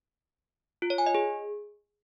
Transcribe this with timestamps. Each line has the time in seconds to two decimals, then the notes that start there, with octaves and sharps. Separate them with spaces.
0.82 F4
0.90 C#5
0.98 G#5
1.06 D#5
1.15 G#4